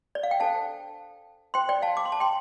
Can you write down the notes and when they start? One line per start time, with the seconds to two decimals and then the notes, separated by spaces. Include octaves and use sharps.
0.15 D5
0.23 F5
0.31 G5
0.40 D4 A4 C5 F5 A5
1.54 F4 C5 G5 C6
1.69 D5 G5
1.82 F5 A5
1.97 D6
2.05 C6
2.12 A5
2.20 G5 C6